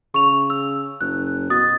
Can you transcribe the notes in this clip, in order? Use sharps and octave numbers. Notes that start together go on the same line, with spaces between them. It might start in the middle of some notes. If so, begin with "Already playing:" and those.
C#3 C#6 F7
E6
F#1 F#6
B2 D#6 A6